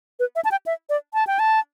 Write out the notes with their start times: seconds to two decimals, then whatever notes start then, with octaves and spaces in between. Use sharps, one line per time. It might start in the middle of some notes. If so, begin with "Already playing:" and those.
0.19 B4
0.36 E5
0.45 A5
0.51 G5
0.66 E5
0.89 D5
1.14 A5
1.27 G5
1.39 A5